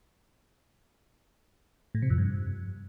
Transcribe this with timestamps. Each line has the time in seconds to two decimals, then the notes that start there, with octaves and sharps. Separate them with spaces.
1.95 A2
2.02 C3
2.10 F2
2.18 G2